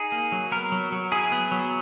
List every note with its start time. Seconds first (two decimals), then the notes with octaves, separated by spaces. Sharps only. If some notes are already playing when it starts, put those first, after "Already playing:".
Already playing: D#4 G#4
0.12 A#3
0.32 F#3
0.52 B3 A#4
0.72 F#3
0.92 F#3
1.12 E4 G#4
1.32 B3
1.51 F#3